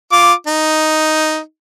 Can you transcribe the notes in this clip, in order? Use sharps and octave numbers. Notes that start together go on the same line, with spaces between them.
F4 D6
D#4